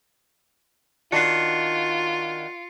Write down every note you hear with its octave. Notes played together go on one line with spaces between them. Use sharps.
D#3 D4 F4 F#4 C7 C#7